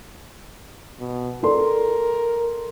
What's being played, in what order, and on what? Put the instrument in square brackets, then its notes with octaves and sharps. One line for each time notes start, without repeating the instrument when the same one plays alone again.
[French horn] B2
[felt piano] A4 D5 C6 [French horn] A#4